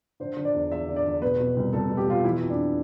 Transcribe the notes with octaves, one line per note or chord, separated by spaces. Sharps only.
D3 C5
D3
D5
E2
E2 E5
D3
D5
E2
B2 B4
B2
C2
C2 A4
B2
G4
B2 F4
E3 E4
F2
D4